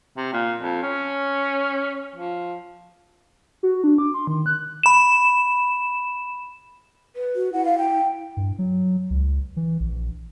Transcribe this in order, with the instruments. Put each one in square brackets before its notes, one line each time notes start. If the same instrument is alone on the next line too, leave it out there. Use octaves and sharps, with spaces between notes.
[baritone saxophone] C3
A#2
F2
C#4
F3
[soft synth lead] F#4
D4
D6
C6
D#3
F#6
[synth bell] B5 E7
[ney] B4
[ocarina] F#4
[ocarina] E4 [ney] F#5
[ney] F5
G5
[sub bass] G2
F#3
C#2
E3
A#1